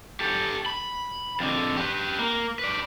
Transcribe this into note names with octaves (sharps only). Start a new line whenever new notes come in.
G4 A4
B5
F2 D3
G4 B4
A#3
B4 D5